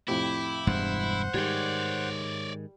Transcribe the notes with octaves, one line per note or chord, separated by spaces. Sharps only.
F2 A2 C3 E4 G5 D6
E1 G2 C5 F#5
G#2 D#3 G3 C#5 D5